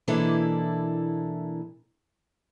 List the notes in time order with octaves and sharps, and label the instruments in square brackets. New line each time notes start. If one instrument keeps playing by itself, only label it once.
[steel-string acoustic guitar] B2 E3 A#3 D4 E4 A4